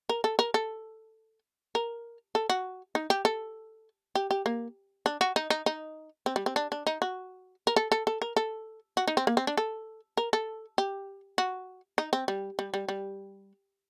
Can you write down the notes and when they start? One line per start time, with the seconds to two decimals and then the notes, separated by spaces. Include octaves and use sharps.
0.09 A#4
0.24 A4
0.39 A#4
0.54 A4
1.75 A#4
2.35 A4
2.50 F#4
2.95 D#4
3.10 G4
3.25 A4
4.15 G4
4.31 G4
4.46 A#3
5.06 D4
5.21 F#4
5.36 D#4
5.50 D#4
5.66 D#4
6.26 C4
6.36 G3
6.46 C4
6.56 D4
6.72 D4
6.87 D#4
7.02 F#4
7.67 A#4
7.76 A4
7.92 A4
8.07 A4
8.22 A#4
8.37 A4
8.97 F#4
9.08 D#4
9.17 C4
9.27 A#3
9.37 C4
9.47 D4
9.57 A4
10.17 A#4
10.33 A4
10.78 G4
11.38 F#4
11.98 D#4
12.13 C4
12.28 G3
12.59 G3
12.74 G3
12.89 G3